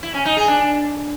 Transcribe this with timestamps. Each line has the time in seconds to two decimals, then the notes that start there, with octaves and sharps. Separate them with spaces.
0.03 E4
0.14 C#4
0.25 D#4
0.37 G#4
0.48 D4